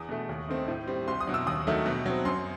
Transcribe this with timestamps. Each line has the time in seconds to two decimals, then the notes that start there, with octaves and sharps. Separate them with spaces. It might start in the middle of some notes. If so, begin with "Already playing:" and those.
Already playing: E2 D#6
0.09 B2 A3
0.29 D#2
0.48 D#3 A3 C4
0.68 A2
0.87 G3 C4
1.08 C2 C6
1.21 D#6
1.27 B2 F#3
1.34 E6
1.46 D#2 D#6
1.67 D#3 F#3 A3
1.86 B2
2.06 F#3 C4
2.25 F#2 C6